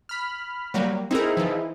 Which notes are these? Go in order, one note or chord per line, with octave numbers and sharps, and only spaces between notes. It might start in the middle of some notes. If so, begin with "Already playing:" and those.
B5 F6
F#3 G3 A#3
C4 D#4 E4 G#4 A#4
E3 F3